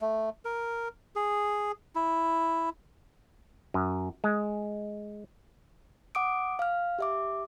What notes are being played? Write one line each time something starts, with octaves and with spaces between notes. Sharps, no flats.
A3
A#4
G#4
E4
F#2
G#3
F#5 D6 D#6 D7
F5 F6
G4 E5 D6